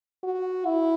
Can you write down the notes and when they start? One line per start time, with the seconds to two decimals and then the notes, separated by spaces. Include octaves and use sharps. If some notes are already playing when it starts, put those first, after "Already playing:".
0.24 F#4
0.66 E4